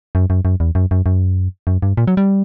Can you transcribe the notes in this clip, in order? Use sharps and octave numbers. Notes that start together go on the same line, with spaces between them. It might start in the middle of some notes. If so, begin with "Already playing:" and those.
F#2
F#2
F#2
E2
F#2
F#2
F#2
F#2
G2
A#2
F#3
G3